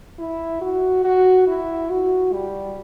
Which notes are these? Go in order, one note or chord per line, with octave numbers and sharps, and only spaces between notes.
E4
F#4
F#4
E4
F#4
G3